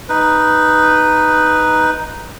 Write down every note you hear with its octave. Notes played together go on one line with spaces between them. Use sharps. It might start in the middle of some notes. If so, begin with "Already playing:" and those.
D#4 B4